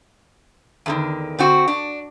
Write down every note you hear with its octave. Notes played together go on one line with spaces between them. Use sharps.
E2 D3 D#3
D3 C4 F#4
D4